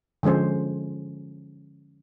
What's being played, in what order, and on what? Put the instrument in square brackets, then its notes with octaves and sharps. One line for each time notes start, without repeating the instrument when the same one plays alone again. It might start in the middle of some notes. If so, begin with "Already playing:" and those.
[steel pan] D3 F3 G#3 C#4 C5